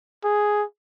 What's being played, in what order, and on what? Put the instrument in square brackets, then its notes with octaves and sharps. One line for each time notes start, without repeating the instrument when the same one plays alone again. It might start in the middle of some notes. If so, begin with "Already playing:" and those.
[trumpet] G#4